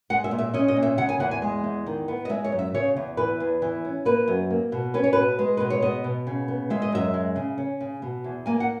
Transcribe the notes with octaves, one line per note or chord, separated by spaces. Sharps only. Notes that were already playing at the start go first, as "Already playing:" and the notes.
G#3 F#5
E5
A#2
E5
C#4 D#5
D#5
A#2
E5
C#3 F#5
G#5
E2 F#5
G#5
G#3
E2
D#3
B3
D#5
G#3 E5
C#5
F#2
E5
C#3 C#5
E2
E3 B4
E2
E3
C#4
A#3 B4
F#2
A#3
B2
C#4 B4
C#5
B2 B4
G#3
B2 B4
C#5
B3 D#5
B2
C#3
B3
G#3 E5
D#5
F#2 E5
G#3
C#3
C#4
C#3
B2
E2
A#3 G#5
F#5